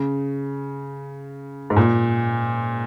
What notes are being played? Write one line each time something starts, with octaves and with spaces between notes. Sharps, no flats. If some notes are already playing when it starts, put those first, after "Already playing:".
Already playing: C#3
G#2
A#2